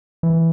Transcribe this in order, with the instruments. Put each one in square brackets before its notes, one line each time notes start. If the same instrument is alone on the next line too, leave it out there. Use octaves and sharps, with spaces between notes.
[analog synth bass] E3